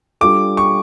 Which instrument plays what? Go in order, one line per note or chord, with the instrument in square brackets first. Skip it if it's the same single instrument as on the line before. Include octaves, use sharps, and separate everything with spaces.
[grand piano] G3 D4 F4 A4 [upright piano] D6
[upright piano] C#6